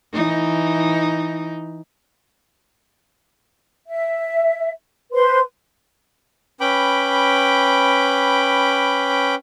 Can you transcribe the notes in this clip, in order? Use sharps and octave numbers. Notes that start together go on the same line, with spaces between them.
E3 D#4
E5
B4 C5 C6
C#4 B4 G5 B5 D6